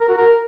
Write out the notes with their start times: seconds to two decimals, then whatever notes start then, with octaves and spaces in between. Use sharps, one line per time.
0.01 A#4
0.09 F#4
0.17 A#4